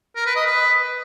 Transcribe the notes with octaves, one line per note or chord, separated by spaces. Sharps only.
A#4
B4
D#5
B4